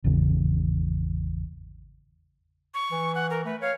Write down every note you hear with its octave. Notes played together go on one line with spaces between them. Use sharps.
G#1 E2 C#3
C#6
E3
F#5
A#4
A3 B4
C#5 F5